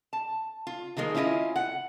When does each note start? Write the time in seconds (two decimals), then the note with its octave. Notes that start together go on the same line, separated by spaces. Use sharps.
0.13 A5
0.67 F4
0.97 D#3 F3 G#3 A#3
1.15 C#4 E4 F4 G4 D#5
1.56 F#5